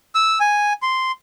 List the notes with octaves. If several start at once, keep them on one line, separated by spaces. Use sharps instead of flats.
E6
G#5
C6